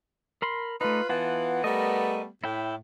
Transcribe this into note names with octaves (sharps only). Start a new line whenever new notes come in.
A#4 B5 C6
A3 D#4 F4 B4
E3 B3 F4 F#5 A5
G3 A3 B3 A#4 D#5
A2 E4 G5